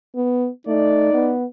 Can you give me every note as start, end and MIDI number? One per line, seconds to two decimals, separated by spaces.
0.16 0.49 59
0.67 1.09 57
0.67 1.34 63
0.67 1.30 74
1.13 1.45 59